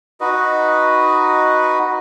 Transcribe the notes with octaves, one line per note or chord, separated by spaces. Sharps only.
D#4 F#4 B4 D#5